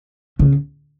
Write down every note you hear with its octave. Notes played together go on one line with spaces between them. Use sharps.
C#3